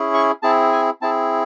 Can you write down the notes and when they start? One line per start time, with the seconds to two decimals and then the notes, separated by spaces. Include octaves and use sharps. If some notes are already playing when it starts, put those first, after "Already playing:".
Already playing: C#4 E4 G#4
0.14 C#6
0.43 C4 E4 G#4 A5
0.72 G#5
1.02 C4 E4 G#4 A5